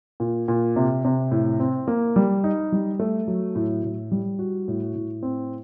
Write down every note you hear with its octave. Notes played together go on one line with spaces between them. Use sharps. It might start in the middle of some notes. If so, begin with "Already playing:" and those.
A#2
A#2
C3
C3
A2
C4
A#3
G3
D#4
G3
A3
F#3
A2
A2
G3
F#4
A2
A2
C4